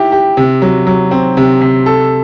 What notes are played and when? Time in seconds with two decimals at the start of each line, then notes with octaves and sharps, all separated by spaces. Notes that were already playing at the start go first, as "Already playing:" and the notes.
Already playing: E4 G4
0.12 G4
0.37 C3
0.62 F#3
0.87 F#3
1.11 C4
1.37 C3
1.61 C3
1.86 A4